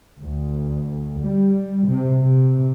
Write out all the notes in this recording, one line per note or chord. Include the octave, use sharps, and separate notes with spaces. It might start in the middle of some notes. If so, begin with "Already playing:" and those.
D2
G3
C3
C3